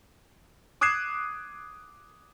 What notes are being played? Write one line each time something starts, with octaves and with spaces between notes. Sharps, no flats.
D6 D#6 F#6 G#6 C7 E7